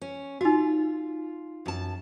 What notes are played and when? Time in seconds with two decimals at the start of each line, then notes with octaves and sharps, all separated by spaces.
0.01 C#4
0.41 D#4 F4 F#4
1.66 F#2 A5